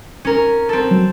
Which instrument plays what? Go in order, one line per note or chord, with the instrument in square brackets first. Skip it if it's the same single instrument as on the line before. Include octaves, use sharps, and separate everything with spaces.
[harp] C#4 A#4
C4 A4
[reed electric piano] F#3